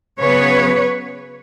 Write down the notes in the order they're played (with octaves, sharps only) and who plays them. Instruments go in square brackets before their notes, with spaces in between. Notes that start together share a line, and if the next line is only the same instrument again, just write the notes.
[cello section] C#3 F#3 B3 B4 C#5